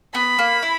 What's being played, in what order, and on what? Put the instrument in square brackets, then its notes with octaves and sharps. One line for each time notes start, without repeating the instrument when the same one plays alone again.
[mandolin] B3 [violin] B5
[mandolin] A#3
E4